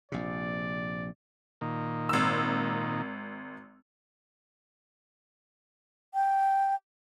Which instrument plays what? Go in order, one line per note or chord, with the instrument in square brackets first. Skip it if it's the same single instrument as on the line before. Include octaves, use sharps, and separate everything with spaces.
[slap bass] A#1 C3 [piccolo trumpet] D5
[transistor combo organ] A#2 D#3
[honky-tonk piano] G#1 E6
[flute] G5